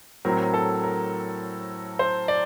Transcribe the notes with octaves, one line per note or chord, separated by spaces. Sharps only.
A2 F#3 C4 A#4
A4
A#4
C5
D5